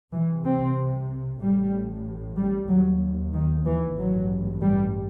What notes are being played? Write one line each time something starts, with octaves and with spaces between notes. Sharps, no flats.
C2 C3 E3
C4
A1 A2 G3
G3
D#2 F#3
D#3
E3
A1 G2 F#3
G3